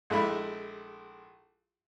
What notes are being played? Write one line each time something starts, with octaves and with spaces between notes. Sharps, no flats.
A#1 G#3 A3 E4 B5